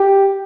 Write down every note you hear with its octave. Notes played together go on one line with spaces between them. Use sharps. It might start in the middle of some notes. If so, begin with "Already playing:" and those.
Already playing: G4